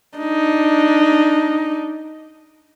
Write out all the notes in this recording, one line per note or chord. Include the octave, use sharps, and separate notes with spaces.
D4 D#4